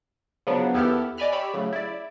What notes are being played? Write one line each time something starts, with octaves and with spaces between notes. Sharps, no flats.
C#3 F3 F#3 B3 D4
D#2 B3 E4 G4 A4 F6
D5 D#5 G#5 B5 F6 F#6
G4 C#5 D5 B5 E6
A2 C#3 F#3
E4 D5